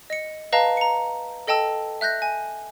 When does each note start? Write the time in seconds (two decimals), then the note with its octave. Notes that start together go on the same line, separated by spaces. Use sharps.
0.10 D#5 C#7
0.53 B4 D#5 F5 A5 A#5
0.77 A#5 C#7
1.47 A4 D#5 G5 A5 E6
2.01 E5 F#6 G6 A#6
2.22 G#5